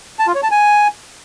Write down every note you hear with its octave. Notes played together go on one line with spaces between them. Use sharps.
A5
F4
C#5
A5
G#5